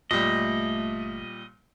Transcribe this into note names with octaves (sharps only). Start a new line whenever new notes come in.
G1 A#2 G3 A3 D#5